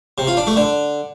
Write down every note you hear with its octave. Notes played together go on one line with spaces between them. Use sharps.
C3
F4
D4
A3
D3